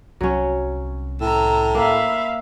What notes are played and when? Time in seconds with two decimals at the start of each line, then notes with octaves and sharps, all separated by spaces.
0.21 C2 F#3 C#4
1.21 A2 A#5 E6
1.75 A#3 E5 F5 B5